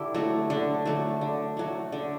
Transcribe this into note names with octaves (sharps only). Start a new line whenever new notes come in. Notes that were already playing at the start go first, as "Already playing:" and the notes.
Already playing: D3 E4 G4
F#3 A3
D3
F#3 A3
D3
F#3 A3
D3